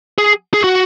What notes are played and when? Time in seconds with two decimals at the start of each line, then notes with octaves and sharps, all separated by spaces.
0.18 G#4
0.54 G#4
0.64 F#4